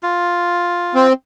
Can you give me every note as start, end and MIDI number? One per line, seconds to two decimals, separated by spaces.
0.03 1.08 65
0.95 1.13 60